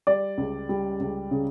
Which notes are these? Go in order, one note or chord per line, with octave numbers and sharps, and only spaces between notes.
G3 D5
C#2
G3
C#2
C#3